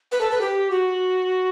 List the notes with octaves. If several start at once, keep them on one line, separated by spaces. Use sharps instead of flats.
B4
A4
B4
G4
F#4